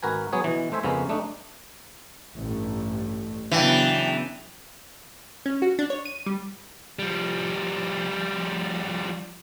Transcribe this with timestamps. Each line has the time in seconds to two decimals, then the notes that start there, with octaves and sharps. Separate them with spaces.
0.03 G#1 F#4 A#4 B4 G#5
0.33 F#3 B3 G#4 C#5
0.44 B2 E3
0.72 A3 C5 E5 G#5
0.83 F2 C#3 G#3 B3 C#4 A#4
1.09 A3 D4 D#4
2.36 A1 G2 A3
3.51 C#3 E3 F#3 B3 D4 G5
5.46 C#4
5.62 F#4
5.79 D4
5.90 C#5
6.06 D#7
6.26 G3
6.99 F3 G3